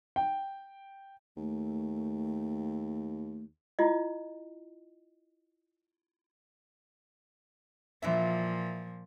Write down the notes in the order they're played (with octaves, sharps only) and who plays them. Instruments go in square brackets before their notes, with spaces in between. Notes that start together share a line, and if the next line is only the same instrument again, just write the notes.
[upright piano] G5
[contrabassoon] D#2 [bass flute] A3
[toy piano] E4 F4 D#5
[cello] A#2 F3 [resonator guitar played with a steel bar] E3 D4 E5